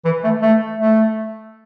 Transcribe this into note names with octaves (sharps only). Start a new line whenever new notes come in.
E3
A3
A3
A3